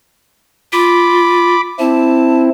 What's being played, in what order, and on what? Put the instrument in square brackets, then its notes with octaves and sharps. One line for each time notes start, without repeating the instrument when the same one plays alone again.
[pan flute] F4 [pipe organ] B5 D6
[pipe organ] C4 E4 [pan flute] A5